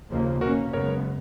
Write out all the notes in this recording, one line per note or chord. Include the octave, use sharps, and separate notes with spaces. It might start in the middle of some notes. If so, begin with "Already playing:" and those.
D#2 C#3 F3 A#3
B2 A#3 C#4 F#4 A#4
F#2 C#3 G#3 B3 A#4 C#5